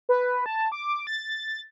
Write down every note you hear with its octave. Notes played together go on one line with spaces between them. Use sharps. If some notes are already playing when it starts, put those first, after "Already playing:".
B4
A5
D6
A6